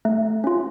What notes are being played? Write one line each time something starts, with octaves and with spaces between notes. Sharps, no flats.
A3
C#4 F4